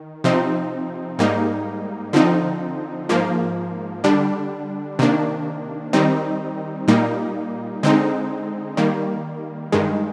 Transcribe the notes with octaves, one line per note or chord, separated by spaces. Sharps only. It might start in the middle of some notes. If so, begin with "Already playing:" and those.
Already playing: D#3
C3 F3 C4 D#4
G#2 G3 A#3 D#4
D3 F3 C4 D#4
G#2 F3 A#3
D3 G3 D4
C3 D#3 A#3 D4
D#3 G3 C4 D#4
A#2 G3 A#3 D#4
D3 G#3 C4 D#4
D#3 G3 A#3
G2 D#3 G#3